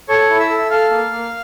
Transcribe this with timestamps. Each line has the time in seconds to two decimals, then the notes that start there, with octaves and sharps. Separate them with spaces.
0.08 A4 C#5 C#6
0.29 E4
0.39 E5 E6
0.49 A4
0.70 A4 F5 F6
0.90 A#3
1.11 A#3